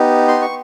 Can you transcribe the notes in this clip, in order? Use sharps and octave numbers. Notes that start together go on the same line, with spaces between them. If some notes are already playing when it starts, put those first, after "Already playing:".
Already playing: B3 D#4 G4
C6
C#6